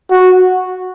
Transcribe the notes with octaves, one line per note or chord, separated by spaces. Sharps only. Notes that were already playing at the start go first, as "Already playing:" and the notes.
F#4